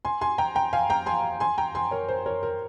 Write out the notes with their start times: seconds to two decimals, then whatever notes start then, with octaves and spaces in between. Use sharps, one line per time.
0.05 G#5 C6
0.21 G#5 C6
0.38 G5 A#5
0.55 G5 A#5
0.73 F5 G#5
0.90 G5 A#5
1.06 G#5 C6
1.40 G#5 C6
1.58 G5 A#5
1.75 G#5 C6
1.91 A#4 C#5
2.08 C5
2.26 A#4 C#5
2.43 A#4